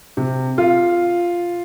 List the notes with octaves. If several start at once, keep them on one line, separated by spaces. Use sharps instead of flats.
C3
F4